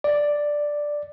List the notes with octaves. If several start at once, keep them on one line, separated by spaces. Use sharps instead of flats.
D5